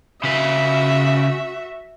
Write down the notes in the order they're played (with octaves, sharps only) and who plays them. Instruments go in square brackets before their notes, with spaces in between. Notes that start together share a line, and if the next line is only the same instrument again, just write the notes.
[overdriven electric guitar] C#3 B4 [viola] F#4 E5